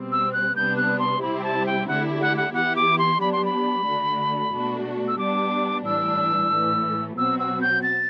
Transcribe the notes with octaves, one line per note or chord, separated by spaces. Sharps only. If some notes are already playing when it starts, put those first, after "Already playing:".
Already playing: B2 G3 C4
E6
F#6
C3 G3 B3 D4 G6
F#6
C6
C3 G3 C4 E4 G4 B5
G5
A5
G5
D3 A3 E4 G4 F#5
F#5
F#5
E3 B3 E4 G4 F#5
D6
C6
F#3 B3 D4 G4 B5
C6
B5
D3 A3 D4 F#4
B2 A3 D4 F#4
E6
G3 B3 D4 G4 D6
A2 E3 G3 D4 E6
A2 E3 A3
B2 F#3 C4 F#4 E6
E6
G6
A6